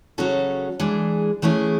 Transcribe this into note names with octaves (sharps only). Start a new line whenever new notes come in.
C#3 F#3 C#4 F#4 A4
E3 G#3 D4 G#4
E3 A3 C#4 E4 G#4